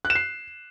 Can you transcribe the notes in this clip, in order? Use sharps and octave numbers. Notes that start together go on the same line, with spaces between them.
F#6
E7
C7